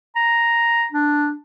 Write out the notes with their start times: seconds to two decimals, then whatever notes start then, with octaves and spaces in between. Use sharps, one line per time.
0.16 A#5
0.93 D4